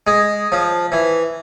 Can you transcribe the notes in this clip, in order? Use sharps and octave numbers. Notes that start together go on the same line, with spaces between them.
G#3
F3
E3